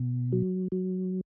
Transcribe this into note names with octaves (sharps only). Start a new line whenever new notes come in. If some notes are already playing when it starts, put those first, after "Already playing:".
Already playing: B2
F#3
F#3